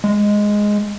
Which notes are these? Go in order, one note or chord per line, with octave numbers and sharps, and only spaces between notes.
G#3